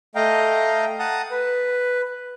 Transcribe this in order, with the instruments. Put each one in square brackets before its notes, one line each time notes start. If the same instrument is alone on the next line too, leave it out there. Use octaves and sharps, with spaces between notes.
[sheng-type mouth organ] A3 D#5 F5 G5 A#5
F#5 A5 A#5 D#6
B4